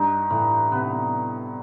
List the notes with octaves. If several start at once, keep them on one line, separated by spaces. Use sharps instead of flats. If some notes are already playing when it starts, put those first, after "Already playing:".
Already playing: G2 D#4
A2 E3
C3 B3